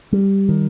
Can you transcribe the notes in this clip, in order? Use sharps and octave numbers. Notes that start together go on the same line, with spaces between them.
G3
D#3